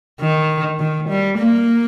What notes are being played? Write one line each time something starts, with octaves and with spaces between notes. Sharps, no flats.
D#3
D#3
G3
A#3